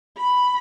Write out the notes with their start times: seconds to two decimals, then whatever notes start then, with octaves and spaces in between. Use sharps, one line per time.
0.17 B5